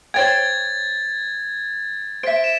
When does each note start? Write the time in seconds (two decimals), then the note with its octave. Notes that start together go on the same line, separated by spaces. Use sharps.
0.14 C5 C#5 G5 G#6 A6
2.23 C5 E5 B6 D7
2.44 E7